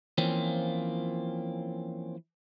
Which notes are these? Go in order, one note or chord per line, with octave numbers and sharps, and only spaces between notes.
E3 F3 A#3 C4 C#4 F4